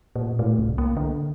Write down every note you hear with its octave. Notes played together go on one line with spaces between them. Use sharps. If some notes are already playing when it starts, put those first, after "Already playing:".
A#2
A2
C2
A#3
D3